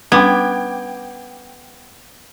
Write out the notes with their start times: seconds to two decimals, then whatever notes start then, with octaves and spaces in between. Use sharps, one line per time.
0.12 G3 B3 C#4 D4 G5 D6 G#6